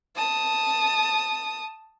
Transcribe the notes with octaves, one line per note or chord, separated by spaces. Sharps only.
A5 D#6